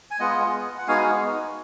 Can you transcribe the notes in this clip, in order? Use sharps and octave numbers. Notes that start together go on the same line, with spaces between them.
G#5
G#3 B3 F4 D#5 F#5
F#5
G#3 B3 D#4 F#4 F5 G#5